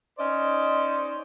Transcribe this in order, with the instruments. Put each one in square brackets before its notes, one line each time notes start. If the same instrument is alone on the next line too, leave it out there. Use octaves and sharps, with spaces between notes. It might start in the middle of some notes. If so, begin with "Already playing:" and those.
[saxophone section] C#4 D#4 C5 D5 D#5